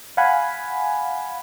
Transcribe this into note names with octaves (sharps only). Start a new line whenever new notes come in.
F5 F#5 G#5 B5